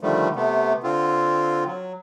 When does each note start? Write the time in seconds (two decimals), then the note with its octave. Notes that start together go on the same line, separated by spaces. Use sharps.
0.01 D3 D#3 F3 G3 A3
0.36 C3 A3 B3
0.83 D3 C4 F4
1.67 F#3